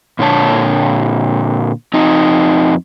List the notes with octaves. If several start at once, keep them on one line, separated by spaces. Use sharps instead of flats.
A#2 D3 C#5 A5
F2 C4 D#4